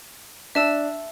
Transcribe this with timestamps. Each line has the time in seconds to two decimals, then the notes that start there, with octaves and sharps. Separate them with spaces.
0.55 D4 E5 A5 E6